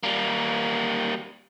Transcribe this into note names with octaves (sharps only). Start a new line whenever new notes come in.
G3 A#3